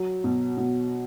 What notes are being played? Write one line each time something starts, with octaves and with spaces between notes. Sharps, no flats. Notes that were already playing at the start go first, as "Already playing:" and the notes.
Already playing: F#3
B2
B2